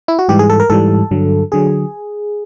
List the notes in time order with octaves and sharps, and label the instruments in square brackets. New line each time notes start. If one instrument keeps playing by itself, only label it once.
[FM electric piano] E4
F#4
G#2 E3 G3 G4
G#4
A4
A#4
G#2 E3 G3 A4
G2 D3 F#3
D3 F#3 G#4